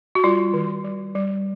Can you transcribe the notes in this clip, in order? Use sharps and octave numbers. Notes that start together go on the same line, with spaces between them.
F#4
G3 F4
D#3
G3
G3